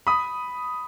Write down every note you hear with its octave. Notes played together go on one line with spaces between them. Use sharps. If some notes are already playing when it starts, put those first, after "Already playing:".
B5 D#6